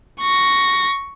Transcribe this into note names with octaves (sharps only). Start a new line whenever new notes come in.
C#6 A#6